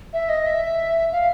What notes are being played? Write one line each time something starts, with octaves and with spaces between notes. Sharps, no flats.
E5
D#5
E5
F5